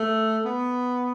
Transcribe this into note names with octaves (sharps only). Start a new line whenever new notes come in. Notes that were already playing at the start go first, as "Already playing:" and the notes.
Already playing: A3
B3